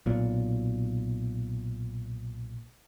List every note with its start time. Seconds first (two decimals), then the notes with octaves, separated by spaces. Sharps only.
0.06 B1 A#2